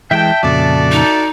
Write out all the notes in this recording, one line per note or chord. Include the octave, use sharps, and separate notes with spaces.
E3 G#3 E5 G5 A5
F2 A#2 C#3 F#4 A4 D5
D#4